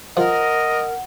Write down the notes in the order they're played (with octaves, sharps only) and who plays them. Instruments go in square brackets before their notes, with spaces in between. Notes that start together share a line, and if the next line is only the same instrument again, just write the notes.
[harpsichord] F3 [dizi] A#4 [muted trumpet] D#5 [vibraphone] F#5